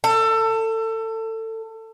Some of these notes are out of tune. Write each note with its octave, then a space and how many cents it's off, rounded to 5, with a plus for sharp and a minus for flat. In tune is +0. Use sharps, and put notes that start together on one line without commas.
A4 +25